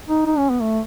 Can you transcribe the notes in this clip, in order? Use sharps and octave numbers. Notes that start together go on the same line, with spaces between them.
D#4
D#4
C#4
B3
A3